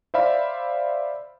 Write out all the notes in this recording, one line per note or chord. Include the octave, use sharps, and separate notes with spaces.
C5 D5 E5 F5 B5